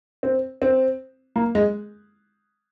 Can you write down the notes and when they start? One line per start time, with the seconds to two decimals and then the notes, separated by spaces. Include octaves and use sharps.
0.23 C4
0.62 C4
1.36 A#3
1.55 G#3